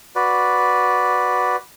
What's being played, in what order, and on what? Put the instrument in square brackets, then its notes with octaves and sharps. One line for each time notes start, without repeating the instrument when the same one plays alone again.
[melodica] F#4 B4 D5